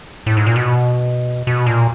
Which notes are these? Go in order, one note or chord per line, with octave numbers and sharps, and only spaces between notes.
A2
G#2
A#2
B2
B2
A#2